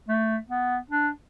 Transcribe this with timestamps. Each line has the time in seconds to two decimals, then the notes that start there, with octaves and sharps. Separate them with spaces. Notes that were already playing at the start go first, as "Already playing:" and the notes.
0.08 A3
0.49 B3
0.90 D4